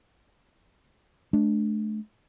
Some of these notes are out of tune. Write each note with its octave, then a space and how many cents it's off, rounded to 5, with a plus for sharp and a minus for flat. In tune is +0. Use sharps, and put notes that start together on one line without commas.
A3 -40 D4 +0